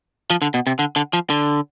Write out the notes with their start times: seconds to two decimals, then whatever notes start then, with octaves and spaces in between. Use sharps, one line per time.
0.30 F3
0.42 D3
0.54 B2
0.67 C3
0.79 D3
0.96 D3
1.13 F3
1.30 D3